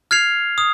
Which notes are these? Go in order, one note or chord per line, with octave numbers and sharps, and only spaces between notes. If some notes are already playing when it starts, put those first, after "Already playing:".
F6 G#6 C7 F7
D#6